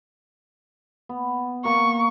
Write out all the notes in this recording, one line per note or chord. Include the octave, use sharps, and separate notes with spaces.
B3
A#3 A#4 C#6